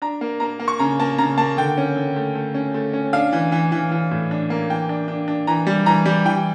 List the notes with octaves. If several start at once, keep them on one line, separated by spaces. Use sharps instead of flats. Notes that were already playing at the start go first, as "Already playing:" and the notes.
D4 A#5
A#3
A#3 A#5
A#3
C#6
C#3 A#5
A#3 A5
C#3 A#5
A#3 A5
D3 G5
C#4
D3
A3
A3
C#4
A3
C#4
D4 F5
E3
E3
E3
E3
A2
D4
A#3
E3 G5
D4
D4
D4
E3 A#5
G3
E3 A#5
G3
E3 G5